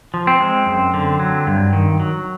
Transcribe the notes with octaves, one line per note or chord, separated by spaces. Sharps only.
F3
C4
G#3
F#2
D3
F#3
G2
D#3
F#3